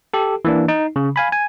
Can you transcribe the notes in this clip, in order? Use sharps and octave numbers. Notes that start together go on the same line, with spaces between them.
G4 A4
E3 A#3 D4
D#4
C#3
F5 G#5 B5
G#5